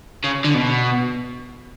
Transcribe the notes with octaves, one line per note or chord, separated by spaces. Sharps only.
C#3
D3
B2